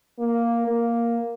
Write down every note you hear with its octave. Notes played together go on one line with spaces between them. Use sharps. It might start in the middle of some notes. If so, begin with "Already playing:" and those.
A#3
A#3